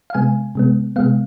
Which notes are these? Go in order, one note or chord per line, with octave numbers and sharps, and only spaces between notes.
F5
C3 G#3 B3 G#5
C3 G#3 B3
C3 G#3 B3 F5